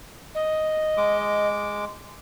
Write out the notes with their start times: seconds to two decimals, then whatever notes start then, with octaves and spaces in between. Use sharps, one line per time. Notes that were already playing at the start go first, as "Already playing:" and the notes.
0.34 D#5
0.97 G#3 D6